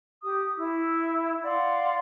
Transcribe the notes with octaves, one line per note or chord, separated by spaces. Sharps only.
G4 D#6
E4 E6
D5 F5 F#5 C6